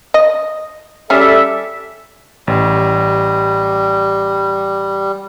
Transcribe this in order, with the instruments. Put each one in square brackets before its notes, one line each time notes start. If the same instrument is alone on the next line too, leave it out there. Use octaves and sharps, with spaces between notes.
[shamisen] D#5
[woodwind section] G3 A4 E5 [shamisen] C#4 G#4
[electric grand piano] A1 [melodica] G3